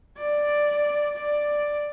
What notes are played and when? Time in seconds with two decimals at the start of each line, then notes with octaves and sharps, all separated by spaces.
0.18 D5
1.17 D5